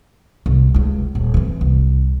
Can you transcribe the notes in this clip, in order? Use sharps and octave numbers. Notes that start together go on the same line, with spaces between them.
C2
C#2 F4
D#1
E3 C4
C2